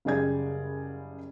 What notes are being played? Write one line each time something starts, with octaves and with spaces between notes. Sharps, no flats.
F#1 C#3 G3 G#4 D5 G#6